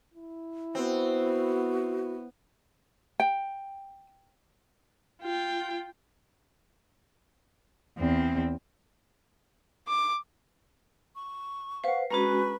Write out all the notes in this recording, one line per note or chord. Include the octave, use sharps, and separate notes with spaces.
E4
B3 C4 F#4
G5
F4 G5
E2 C4
D6
C#6
B4 C5 F5 F#5
G#3 C#4 D4 F#4 G#4 A#4 B4 C#6